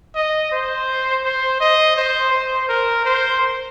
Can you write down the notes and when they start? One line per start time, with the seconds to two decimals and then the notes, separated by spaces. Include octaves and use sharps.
0.15 D#5
0.52 C5
1.24 C5
1.60 D#5
1.96 C5
2.32 C5
2.69 A#4
3.05 C5